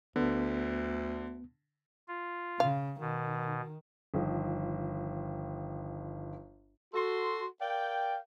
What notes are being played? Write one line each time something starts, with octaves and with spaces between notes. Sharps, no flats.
D2 D3 B3
F4
C#3 F5
B2 D#3
G1 D#3 F3
F#4 A4 C6
A#4 D5 F5 G5